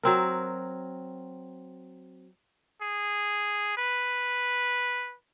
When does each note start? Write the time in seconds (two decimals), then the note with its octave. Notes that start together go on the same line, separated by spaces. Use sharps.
0.03 F#3 C4 A#4
2.81 G#4
3.77 B4